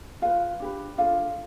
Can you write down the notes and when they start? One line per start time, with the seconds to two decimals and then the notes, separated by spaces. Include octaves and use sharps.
0.22 F4 B4 F5
0.60 D4 G4 B4
0.98 D4 F4 A4 F5